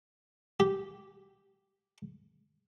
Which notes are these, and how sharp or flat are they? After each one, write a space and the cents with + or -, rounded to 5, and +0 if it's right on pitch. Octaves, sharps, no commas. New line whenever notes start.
G4 -10